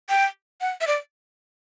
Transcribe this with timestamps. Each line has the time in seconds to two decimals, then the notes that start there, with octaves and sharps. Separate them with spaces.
0.09 G5
0.61 F#5
0.81 E5
0.87 D5